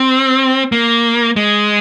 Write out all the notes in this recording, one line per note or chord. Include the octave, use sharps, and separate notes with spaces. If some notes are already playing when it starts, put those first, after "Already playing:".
Already playing: C4
A#3
G#3